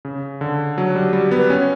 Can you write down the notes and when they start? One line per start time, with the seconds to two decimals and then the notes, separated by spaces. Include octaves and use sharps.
0.05 C#3
0.41 D3
0.78 F#3
0.95 G3
1.13 G3
1.31 B3
1.50 C#4